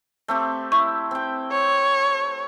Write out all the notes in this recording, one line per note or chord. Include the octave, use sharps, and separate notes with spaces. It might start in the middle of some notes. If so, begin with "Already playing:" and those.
A3 C4 G4
E4 C#6
C4 G5
C#5